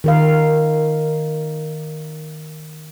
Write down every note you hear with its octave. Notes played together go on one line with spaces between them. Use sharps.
D#3 A#4 F5